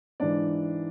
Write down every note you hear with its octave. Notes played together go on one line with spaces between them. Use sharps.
G#2 E3 D4 D5